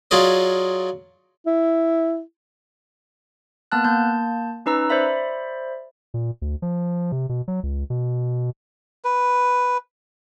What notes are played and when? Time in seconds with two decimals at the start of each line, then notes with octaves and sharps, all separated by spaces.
0.11 F#3 F4 G#4 D5 D#5
1.47 E4
3.72 A#3 B3 A5 F#6
3.84 A#3 A5 G6
4.66 C#4 D#4 B4 A#5 E6
4.89 C5 D5 E5 B5
6.14 A#2
6.42 D2
6.62 F3
7.12 C3
7.29 B2
7.48 F#3
7.63 C#2
7.90 B2
9.05 B4